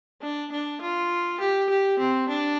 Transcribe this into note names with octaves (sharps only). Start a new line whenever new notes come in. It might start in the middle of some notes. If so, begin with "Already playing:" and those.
D4
D4
F4
G4
G4
C4
D4